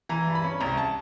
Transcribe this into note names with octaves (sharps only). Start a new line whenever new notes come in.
E3 A#5
G2
B5
C#4
C2 A#5
A5